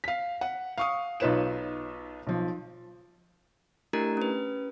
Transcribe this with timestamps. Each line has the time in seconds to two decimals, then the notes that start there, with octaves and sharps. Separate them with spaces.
0.04 F5 B6
0.41 F#5
0.78 F5 C#6 D#6
1.20 B1 D#4 F4 B4 C#5 E7
2.27 B1 F3
3.93 A3 D4 E4 G4 A#4 A#5
4.17 C#4 B4